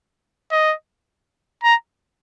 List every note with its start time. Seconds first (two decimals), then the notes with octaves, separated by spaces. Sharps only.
0.51 D#5
1.64 A#5